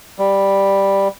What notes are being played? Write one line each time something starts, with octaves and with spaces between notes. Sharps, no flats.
G3